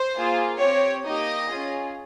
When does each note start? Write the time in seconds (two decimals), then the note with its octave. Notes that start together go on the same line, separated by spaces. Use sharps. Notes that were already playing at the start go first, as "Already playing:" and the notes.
Already playing: C5
0.14 A#3 F4 G#4
0.60 C4 G4 C#5
1.05 A#3 D#4 G4 D#5
1.50 C#4 F4 G#4